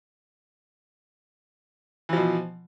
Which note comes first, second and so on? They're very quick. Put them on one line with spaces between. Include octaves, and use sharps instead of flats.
E3 F3 B2